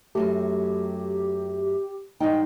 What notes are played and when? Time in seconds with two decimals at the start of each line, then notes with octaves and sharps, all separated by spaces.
0.15 F#2 F#3 A3 G4
2.20 G#2 G3 D#4 G5